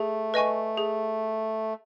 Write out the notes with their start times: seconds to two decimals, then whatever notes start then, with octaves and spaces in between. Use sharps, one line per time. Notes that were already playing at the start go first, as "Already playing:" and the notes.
Already playing: A3 G#4
0.34 B4 D#5 G#5 C#6
0.77 G#4